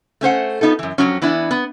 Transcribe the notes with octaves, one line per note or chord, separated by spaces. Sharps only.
A3 C#4 C5 F#5
B3 D#4 F4 A4
F#2 E3
F2 B2 F#3 C#4
E3 B3 D4 E4
B3